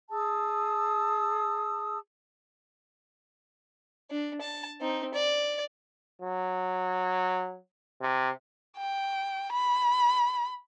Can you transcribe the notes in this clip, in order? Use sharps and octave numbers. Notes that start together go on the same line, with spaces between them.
G#4 A5 D#6 E6
D4
A5
C4 D#4
D5
F#3
C3
G5
B5